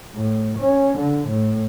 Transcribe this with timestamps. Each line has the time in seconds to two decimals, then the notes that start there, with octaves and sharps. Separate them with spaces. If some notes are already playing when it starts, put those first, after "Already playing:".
0.15 A2
0.58 C#4
0.98 D3
1.29 A2